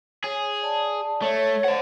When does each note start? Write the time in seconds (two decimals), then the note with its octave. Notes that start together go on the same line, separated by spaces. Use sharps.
0.24 G#4 C#5
0.62 D5 A5
1.22 A3 C#5
1.64 C5 F5 F#5 A5